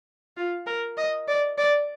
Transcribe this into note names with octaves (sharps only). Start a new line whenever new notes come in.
F4
A#4
D#5
D5
D5